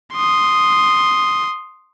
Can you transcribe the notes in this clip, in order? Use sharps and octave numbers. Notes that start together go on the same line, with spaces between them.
C6 D#6